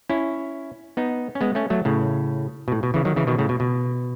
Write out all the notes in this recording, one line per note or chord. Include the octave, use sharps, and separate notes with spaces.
C#4 E4
B3 D#4
C#4
G#3 B3
A3 C#4
F#3 A3
A2 C#3
B2
A2
B2
C#3 E3
D#3 F#3
C#3 E3
B2 D#3
A2 C#3
B2
B2